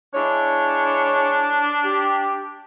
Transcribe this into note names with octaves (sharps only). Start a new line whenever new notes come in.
G#3 D4 E4 C#5
G4